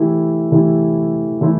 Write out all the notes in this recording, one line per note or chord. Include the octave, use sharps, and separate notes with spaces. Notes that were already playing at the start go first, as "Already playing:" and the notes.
Already playing: E3 A3 E4 G4
E3 A3 E4 G4
E3 A3 E4